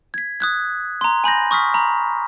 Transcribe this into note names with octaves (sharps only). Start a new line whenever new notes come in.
G#6 B6
D#6 F#6 G#6
A#5 C6
G#5 B5 G6 A#6
C#6 D#6 F6 B6
A#5 B5